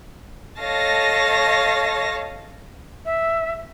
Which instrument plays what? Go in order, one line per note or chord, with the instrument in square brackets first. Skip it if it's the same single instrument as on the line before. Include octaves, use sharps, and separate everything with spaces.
[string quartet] A4 C#5 D#5 F5 A5 A#6
[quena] E5